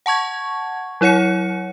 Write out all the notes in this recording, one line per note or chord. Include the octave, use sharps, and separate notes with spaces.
F#5 A5 C#6 G#6
F#3 E4 C#5 F#5 C#7